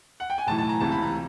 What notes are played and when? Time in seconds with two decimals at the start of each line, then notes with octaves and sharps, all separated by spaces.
0.20 F#5
0.30 G5
0.38 G#5
0.47 B1 A2 E3 A5
0.58 A5
0.69 A#5
0.80 C#2 C3 E3 A5
0.92 B5
1.02 A#5